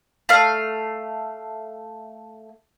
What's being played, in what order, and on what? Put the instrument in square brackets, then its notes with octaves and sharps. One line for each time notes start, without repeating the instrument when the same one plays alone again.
[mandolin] A3 F5